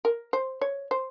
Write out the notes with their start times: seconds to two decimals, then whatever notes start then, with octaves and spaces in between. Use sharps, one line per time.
0.05 A#4
0.33 C5
0.61 C#5
0.91 C5